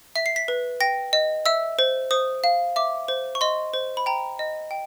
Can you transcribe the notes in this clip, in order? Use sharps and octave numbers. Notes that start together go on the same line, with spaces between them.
E5 B6
C7
B6
B4
G5 A#6
D#5
E5 E6
C5
C5 D#6
F5
E5 D6
C5
C#6
D#5 C6
C5
B5
G5 A#5
D#5
G5